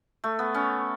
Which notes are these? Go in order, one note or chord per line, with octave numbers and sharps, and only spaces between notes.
A3
B3
C#4